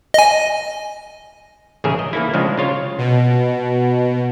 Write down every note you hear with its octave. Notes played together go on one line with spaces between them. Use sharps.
D#5 G#5
A1 C#3 D#4 G#4 A#4 E5
D#5
E3 A3 A#3 D#4 E4
C#3 F3 G#3 A#3 C4 D4
C#3 F4 C#5
B2